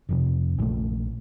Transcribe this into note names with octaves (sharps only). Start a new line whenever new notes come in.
F1 F2 C3
A#1 A#2 A3